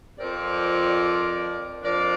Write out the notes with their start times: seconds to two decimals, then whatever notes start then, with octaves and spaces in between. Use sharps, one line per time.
0.19 F2 F3 C4 A#4 D5
1.82 F2 F3 D4 A#4 D5